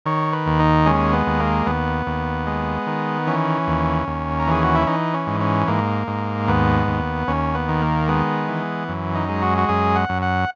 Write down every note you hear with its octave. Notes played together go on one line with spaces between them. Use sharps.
D#3 C#5
B4
D#2
D#4
G#3 C#4
B3
D#2
A#3
D#2 B3
D#2
G#3
D#3
E3 C#4
D#2
D#2
A#4
E3 G#4
F#4
E4
E3 D#4
C#4
G#2
C#4
G#2 A#3
G#2
D#2 B3
D#2
D#2 C#4
B3
D#3
A#3
G#3 B3
E3
F#2
D#4
G#3
F#4
F#4
F#2 G#4
F#5
F#2
F#5